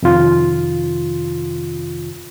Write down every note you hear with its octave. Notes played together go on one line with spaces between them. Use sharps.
F2 C3 D#3 F4